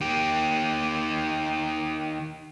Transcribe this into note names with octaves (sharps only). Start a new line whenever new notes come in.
D#3 G4